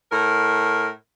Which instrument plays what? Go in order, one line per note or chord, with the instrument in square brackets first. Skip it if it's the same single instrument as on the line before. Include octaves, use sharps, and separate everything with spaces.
[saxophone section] A2 A#4